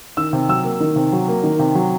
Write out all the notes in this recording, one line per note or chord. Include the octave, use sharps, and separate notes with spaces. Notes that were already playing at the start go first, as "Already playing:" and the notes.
D#3 E6
C3
F#3 E6
A#3
D#3
C3
F#3
A#3
D#3
C3
F#3